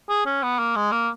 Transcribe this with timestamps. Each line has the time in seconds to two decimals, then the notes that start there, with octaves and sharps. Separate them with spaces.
0.09 G#4
0.26 C#4
0.43 B3
0.59 A#3
0.76 G#3
0.92 A#3